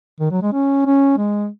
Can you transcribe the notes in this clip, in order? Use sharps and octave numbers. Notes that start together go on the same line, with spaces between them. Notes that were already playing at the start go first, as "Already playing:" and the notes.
D#3
F#3
G#3
C#4
C#4
G#3